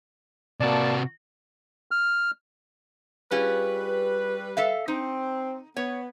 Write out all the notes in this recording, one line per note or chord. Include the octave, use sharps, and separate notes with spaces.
C3 A#3 F#4 D5 A5
F6
G3 C#4 F4 G#4 B4
A4 E5 F5
C4 D#4
B3 C#5